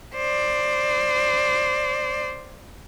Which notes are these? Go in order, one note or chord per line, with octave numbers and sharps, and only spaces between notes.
C5 D5